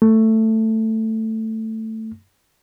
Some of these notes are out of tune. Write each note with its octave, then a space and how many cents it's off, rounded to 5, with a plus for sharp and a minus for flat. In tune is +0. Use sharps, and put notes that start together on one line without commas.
A3 +10